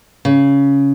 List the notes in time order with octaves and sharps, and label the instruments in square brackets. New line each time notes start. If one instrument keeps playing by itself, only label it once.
[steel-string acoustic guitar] C#3